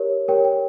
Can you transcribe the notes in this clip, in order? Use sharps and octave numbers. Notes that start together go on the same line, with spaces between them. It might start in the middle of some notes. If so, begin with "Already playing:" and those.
Already playing: G4 A#4 C#5
G4 A#4 C#5 G5
G5